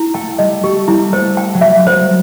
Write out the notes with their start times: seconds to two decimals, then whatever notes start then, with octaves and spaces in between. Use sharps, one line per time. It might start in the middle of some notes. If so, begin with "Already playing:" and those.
Already playing: E4
0.14 A3 G5
0.39 G3 D#5
0.63 A3 G4
0.88 G3 E4
1.12 A3 C5
1.37 G5
1.54 F#3
1.61 G3 E5
1.86 F#3 C5